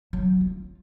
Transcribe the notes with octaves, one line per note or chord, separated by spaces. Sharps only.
F#3
F4